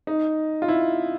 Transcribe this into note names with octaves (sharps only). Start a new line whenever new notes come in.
D#4
F4
E4